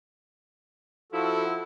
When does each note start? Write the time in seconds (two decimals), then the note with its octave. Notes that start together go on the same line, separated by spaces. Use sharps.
1.12 F3 E4 F#4 A4